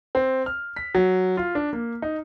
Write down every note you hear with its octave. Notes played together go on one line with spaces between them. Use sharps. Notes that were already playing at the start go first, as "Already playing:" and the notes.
C4
F6
B6
F#3
F4
D4
A#3
D#4